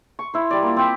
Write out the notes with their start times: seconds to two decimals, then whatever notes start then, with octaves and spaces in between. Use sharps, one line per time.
0.19 C#6
0.34 E4 C5
0.51 G3 D5
0.63 A#3 F4
0.76 C4 G5 B5